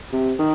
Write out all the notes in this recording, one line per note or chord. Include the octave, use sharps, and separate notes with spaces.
C3
D#3